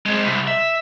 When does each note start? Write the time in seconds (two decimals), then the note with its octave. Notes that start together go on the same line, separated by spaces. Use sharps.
0.06 G#3 C4
0.24 C2
0.47 E5